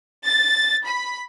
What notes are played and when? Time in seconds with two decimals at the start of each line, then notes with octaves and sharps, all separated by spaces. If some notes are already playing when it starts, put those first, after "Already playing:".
0.24 A6
0.85 B5